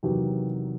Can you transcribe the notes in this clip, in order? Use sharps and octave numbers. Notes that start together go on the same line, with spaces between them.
E2 C3 D#3 F#3 G4